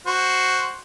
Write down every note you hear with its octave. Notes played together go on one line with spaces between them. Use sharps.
F#4 C5